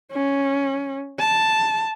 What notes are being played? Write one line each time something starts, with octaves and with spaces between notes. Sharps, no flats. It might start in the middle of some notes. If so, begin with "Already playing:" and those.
C#4
A5